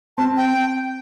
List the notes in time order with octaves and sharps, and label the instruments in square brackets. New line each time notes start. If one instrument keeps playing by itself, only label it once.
[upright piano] C4 [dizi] A5
[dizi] G5